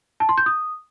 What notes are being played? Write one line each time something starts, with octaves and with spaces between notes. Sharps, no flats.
A5
C6
G6
D#6